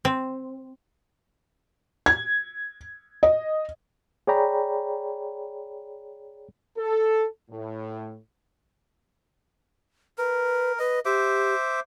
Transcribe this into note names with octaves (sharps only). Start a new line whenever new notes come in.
C4
G#6
D#5
G#4 C#5 D5 G5 A#5 B5
A4
A2
A#4 B4
B4 D#5
G4 C5 E5 D6